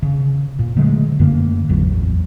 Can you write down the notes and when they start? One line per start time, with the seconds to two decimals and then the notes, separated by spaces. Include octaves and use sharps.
0.03 C#3
0.59 A#2
0.76 D3 F#3 G#3 A3
1.19 F#2 D3 A3 A#3
1.68 A1 E2 F#3